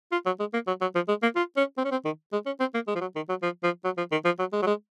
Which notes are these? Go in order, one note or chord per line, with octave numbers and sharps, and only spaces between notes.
F4
F#3
G#3
A#3
F#3
F#3
F3
G#3
A#3
F4
C#4
C4
C#4
C4
D#3
G#3
C#4
C4
A#3
G#3
F3
F#3
D#3
F#3
F3
F3
F#3
F3
D#3
F3
F#3
G#3
F#3
G#3